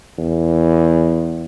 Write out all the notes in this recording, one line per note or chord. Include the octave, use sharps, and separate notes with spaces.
E2